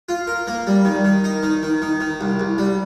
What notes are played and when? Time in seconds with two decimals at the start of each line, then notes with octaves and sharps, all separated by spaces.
0.09 F4
0.27 A#4
0.47 A#3
0.67 G3
0.85 D#3
1.05 D#3
1.24 D#4
1.43 D#3
1.63 D#3
1.82 D#3
2.00 D#3
2.21 C2
2.40 C2
2.58 G3